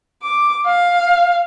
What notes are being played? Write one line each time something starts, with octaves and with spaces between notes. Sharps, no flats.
D6
F5